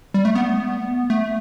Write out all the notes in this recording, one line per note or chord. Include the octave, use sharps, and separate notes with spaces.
G3
A3
B3
A3